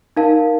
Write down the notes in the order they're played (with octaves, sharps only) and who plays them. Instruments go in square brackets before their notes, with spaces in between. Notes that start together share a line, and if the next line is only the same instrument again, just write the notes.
[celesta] D#4 A#4 F5 A5